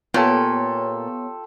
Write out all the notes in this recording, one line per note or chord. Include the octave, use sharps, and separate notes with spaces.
A#2 B3 F4 G4 A4 C#5